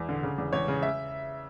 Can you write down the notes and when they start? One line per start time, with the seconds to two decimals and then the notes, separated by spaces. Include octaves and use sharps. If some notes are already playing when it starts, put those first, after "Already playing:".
Already playing: E2
0.09 D3
0.23 C#3
0.38 E2
0.53 E2 C#5
0.68 C#3
0.82 E5